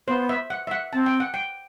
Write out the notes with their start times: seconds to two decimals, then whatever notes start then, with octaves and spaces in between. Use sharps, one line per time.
0.07 B3 C5
0.29 E5
0.50 F#5
0.67 E5
0.71 F#5
0.93 C4 A5
1.06 G5
1.20 F#5
1.34 G5